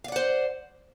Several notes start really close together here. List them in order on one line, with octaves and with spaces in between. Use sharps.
F5 D5 F#5 C5